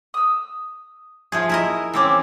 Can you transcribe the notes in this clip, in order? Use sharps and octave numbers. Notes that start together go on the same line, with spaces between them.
D#6 E6
F3 F4 G#4 E5 G6
E4 A#4 D#5
E3 C4 C#4 D6 E6